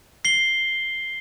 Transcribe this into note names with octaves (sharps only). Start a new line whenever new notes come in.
C7 G7